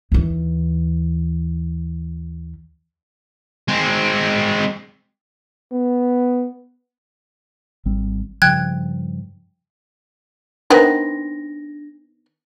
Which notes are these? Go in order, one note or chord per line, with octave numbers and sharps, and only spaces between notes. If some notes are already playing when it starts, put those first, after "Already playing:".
D#2 E3
G#3 C4
B3
G#1 G3 C4
G2 C#3 F3 G5 F#6 G#6
D#3 B3 C4 D4 A#6